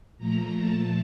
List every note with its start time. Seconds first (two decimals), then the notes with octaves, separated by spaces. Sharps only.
0.18 A#2 F3 A3 A#5
0.56 A5